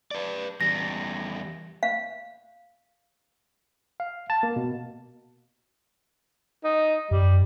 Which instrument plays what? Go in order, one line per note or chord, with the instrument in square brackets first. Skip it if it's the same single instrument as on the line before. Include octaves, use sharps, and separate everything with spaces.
[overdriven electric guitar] B4 D5
[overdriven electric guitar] E2 G3 [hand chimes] A#6
[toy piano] F5
[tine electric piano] F5
A5
A#3
B2
[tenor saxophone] D#4
[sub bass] F#2 [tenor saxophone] G3